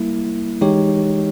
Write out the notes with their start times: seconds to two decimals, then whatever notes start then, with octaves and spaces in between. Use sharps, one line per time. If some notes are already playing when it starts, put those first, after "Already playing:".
Already playing: G3 A#3 E4
0.61 E3 G#3 D#4 G4 C#5